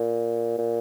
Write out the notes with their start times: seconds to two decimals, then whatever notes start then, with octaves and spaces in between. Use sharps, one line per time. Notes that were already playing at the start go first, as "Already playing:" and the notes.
Already playing: A#2
0.58 A#2